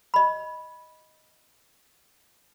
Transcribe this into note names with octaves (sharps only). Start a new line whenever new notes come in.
D#5 B5